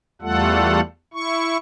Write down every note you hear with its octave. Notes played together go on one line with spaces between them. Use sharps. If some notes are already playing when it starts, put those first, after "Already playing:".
E2 G3 A3 F4 A4 F#5
E4 C#6